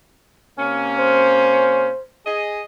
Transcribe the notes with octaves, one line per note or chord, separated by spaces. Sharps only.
C3 A#3 C#4
C5
G#4 D#5